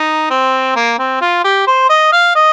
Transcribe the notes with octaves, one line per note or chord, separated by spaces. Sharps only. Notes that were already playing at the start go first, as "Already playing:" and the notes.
Already playing: D#4
C4
A#3
C4
F4
G4
C5
D#5
F5
D#5